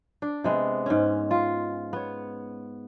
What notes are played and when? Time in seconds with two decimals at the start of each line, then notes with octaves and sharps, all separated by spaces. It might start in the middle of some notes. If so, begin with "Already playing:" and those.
0.22 D4
0.44 C3 G#3 B3
0.86 G#2 C#4
1.31 F4
1.93 B3 C#5